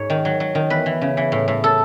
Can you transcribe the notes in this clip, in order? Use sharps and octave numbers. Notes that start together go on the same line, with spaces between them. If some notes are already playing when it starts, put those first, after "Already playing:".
Already playing: G#2 C#5
D#3
F#3
F#3
D#3
E2 B4
E3
C#3
E3
A2
A2
A4